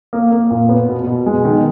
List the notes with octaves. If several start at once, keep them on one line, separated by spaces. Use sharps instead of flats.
A#3
A#3
A#2
B3
B2
B2
G#3
D#3